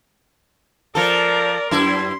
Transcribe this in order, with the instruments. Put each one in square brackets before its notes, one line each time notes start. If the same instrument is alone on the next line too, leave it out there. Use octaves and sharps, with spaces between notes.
[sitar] F3 A4 [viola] A#4 D5
[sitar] F#2 E4 [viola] C6